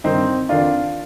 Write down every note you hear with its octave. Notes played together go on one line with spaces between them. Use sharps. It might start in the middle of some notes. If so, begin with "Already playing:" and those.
G2 D#3 C4 D#4
F2 D#3 D4 F4